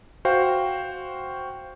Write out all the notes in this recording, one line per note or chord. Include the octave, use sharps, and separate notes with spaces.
F#4 C5 F5 G5